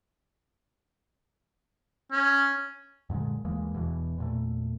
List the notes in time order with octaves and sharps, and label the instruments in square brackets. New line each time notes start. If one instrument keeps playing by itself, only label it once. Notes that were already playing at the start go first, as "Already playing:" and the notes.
[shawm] C#4
[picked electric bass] F#2 A#2 D3 G#3
D#2 E3 G#3 A#3
E1 E2 B2 E3
E2 A#2 A3